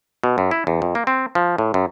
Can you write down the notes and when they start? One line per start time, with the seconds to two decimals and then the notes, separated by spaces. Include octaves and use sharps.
0.24 B2
0.38 F#2
0.51 E4
0.67 E2
0.82 F2
0.95 A#3
1.07 C4
1.35 F3
1.58 A2
1.74 F#2